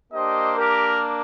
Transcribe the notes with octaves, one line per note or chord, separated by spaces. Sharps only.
A#3 D4 G4 C5 D#5
G4 A#4